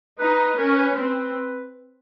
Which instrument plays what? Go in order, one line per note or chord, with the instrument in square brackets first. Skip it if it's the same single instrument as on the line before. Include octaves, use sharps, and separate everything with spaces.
[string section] D#4 [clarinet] B4
[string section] C#4 [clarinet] A#4
[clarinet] B4
[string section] C4 [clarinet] B4